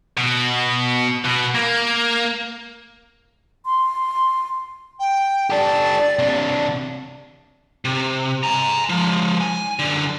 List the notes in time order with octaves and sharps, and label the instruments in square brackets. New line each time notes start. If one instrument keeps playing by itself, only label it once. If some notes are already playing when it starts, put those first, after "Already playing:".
[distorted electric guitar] B2
B2
A#3
[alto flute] C6
[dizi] G5
[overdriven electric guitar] G4 A4 [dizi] D5
[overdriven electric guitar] C3 D4
[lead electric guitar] C3
G#5 A#5
F3 G#3
G#5
F#2 D3